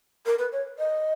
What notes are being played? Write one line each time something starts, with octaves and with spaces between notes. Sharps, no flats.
A#4
B4
C#5
D#5